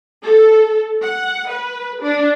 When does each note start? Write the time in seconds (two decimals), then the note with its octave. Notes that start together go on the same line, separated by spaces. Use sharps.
0.23 A4
1.02 F#5
1.49 B4
2.02 D4